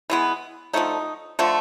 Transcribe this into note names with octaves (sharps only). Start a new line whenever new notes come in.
E3 G#3 B3
D3 F3 A3 D#4
D3 F3 A3